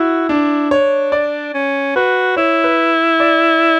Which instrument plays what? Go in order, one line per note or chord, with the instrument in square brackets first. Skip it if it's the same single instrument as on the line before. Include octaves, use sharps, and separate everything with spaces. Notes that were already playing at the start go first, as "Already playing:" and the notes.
Already playing: [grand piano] E4 [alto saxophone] F#4
[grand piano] D4 [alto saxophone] E4
[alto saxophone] D4 [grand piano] C#5
[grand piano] D5
[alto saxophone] C#4
[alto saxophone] F#4 [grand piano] B4
[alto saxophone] E4 [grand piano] C#5
[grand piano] B4
D5